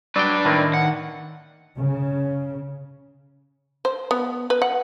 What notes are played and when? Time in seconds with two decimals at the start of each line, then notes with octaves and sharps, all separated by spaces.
0.16 F#3 D4 B4 D5 G5
0.45 A2 D#3 A#3 C4
0.74 F#5
1.78 C#3
3.85 C5
4.11 B3
4.50 B4
4.62 F#5